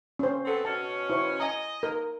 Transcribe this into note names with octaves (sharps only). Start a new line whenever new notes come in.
C#4 C5
B3 C4 A4
B2 C#4 A5
E4 C5 C#6
D#5 G#5 A#5
A#4